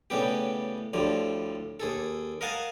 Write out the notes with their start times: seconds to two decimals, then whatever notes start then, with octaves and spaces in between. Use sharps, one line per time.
0.10 A2 C#3 G3 B3 G4
0.93 D2 A2 F3 G3
1.80 D#2 G#4 A4
2.41 A#4 D#5 F5 F#5 G#5 A5